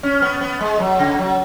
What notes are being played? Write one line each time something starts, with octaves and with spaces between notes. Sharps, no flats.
C#4
B3
B3
G#3
F#3
C#3
F#3